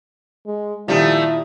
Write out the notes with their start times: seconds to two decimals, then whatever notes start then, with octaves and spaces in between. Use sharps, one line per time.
0.47 G#3
0.88 A#2 D#3 F3 G3 A3 E4